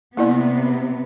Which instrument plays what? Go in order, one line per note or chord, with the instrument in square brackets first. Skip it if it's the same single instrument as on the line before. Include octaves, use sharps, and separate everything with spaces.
[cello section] C3 B3 [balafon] A#3 E4 D5